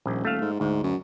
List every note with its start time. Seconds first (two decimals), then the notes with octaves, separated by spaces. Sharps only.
0.06 D#1 A#1
0.25 A3 F5
0.41 G#2
0.60 D2 G#2
0.83 F#2